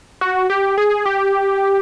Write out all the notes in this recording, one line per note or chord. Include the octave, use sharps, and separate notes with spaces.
F#4
G4
G#4
G4